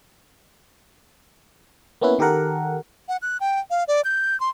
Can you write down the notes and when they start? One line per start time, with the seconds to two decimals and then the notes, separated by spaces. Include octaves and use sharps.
2.01 A#3 B3 C#4 E4 B4
2.19 D#3 G4 A4 A#4 F#5
3.09 F#5
3.22 F#6
3.41 G5
3.71 F5
3.88 D5
4.05 G6
4.40 C6